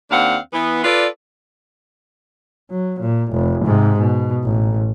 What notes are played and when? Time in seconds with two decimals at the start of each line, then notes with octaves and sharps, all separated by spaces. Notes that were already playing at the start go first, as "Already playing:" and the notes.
0.11 D#2 C4 D4 F5 F#5
0.53 E3 B3
0.84 F4 A4 B4 D5
2.70 F#3
3.00 A#2
3.32 F1
3.65 G#2 C3
3.99 B2
4.44 A1